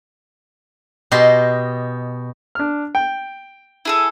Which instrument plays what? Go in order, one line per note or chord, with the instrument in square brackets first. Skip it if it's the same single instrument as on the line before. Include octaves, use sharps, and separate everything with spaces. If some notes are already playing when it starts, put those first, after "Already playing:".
[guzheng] B2 G4 D#5 C6
[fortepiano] D4 F6
G5
[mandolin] E4 G#4 A4